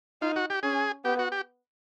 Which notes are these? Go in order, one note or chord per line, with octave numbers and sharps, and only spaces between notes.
D#4 F4
F#4
G4
C#4 G#4
B3 G4
F#4
G4